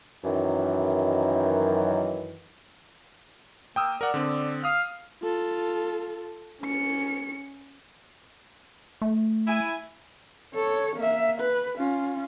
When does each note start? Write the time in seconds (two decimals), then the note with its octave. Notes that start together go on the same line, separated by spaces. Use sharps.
0.24 F#2 D#3 E3
3.76 A#3 G5 D#6 E6
4.01 A#4 D5 F#5
4.14 D3 C4
4.64 F5 D#6 F6
5.23 F4 A4
6.62 C#4 C#7
9.02 A3
9.46 E4 G#5
10.55 A4 C#5
10.96 A#3 E5
11.41 B4
11.78 C#4 F4